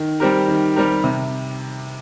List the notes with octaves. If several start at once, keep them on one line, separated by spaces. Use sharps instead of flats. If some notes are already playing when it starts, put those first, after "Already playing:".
Already playing: D#3
G3 C4 G4 A#4
D#3
G3 C4 G4 A#4
C3